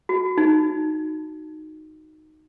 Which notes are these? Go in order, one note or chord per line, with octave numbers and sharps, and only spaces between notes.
F#4
D#4